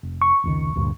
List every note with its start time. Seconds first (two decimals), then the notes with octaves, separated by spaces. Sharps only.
0.03 F1
0.22 C#6
0.44 F1 C#2 D#3
0.76 D2 G2 A#2